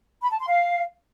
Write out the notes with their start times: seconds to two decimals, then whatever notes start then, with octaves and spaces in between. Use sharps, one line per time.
0.22 B5
0.30 A5
0.39 C6
0.47 F5